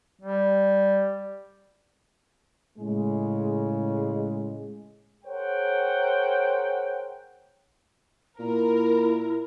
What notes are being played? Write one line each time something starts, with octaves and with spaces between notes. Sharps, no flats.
G3
A2 C#3 G#3
G#4 A#4 C5 C#5 F#5 G5
A#2 E4 A#4